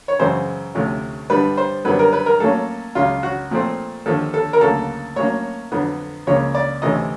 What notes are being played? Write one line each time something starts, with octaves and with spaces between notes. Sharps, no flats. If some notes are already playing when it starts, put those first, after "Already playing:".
C#5
F#2 C#3 E3 G#3 C#4 C5
D2 C3 F3 A3 C#4
G2 D3 G3 B3 B4
C5
F#2 D3 G3 B3 B4
A#4
B4
A#4
A2 F#3 A#3 C#4 A4
C#2 C#3 F#3 F4
F#4
A#2 F3 A3 C4
D#2 D3 F3 A4
A4
A#4
D2 C#3 F#3 A#3 A4
A2 F#3 A#3 C#4 C#5
F2 D3 F#3 B3
C#2 C#3 F3 A#3 C#4 C#5
D5
D2 C3 E3 A3 C#4 D#5